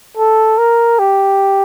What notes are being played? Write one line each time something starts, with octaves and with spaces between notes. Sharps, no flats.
A4
A#4
G4